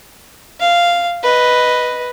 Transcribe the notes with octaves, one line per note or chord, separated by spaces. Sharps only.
F5
B4 D#5